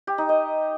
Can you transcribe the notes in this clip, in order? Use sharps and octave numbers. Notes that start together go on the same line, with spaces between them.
G4
D#4
D#5